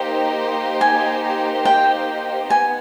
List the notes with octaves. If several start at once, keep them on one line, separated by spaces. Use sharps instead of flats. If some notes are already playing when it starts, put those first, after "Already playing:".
Already playing: A#3 D#4 G4 C5
G#5
G5
B3 G#5